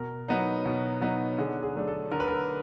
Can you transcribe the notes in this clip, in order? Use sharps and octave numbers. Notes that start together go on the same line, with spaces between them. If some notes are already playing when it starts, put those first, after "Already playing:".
Already playing: B2 A#4
F#3 B3 D#4
B2
F#3 B3 D#4
D3 G#4
G#4
F#3 A3 D4
A4
D3 A#4
B4
A#4